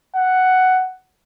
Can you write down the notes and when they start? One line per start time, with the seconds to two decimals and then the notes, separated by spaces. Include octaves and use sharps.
0.16 F#5